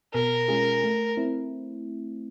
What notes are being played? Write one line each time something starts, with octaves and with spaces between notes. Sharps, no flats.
B2 A#4
G#3 C#4 F4 G#4
A3
C4 E4